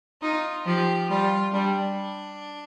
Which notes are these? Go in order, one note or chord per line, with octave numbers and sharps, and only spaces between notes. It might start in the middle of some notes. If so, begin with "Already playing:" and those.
D#4 F4
F3 G4
G3 F4
G3 D4